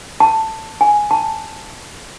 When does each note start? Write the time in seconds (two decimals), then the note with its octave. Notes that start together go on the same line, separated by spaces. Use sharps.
0.20 A5
0.81 G#5
1.11 A5